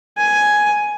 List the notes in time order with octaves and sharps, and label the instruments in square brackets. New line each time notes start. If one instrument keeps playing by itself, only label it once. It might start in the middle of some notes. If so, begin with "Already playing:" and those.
[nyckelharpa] G#5